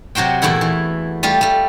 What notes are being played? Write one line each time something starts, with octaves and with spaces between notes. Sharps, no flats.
C3 F#3 F#4 C5 G5
E2 A#2 A3 E4 F#5
E3
G3 A3 F4 G4
G3 A3